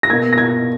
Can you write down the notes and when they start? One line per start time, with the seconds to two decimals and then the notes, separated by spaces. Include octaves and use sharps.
0.03 A#6
0.10 B2 A#3 G#6
0.33 A#6
0.38 G#6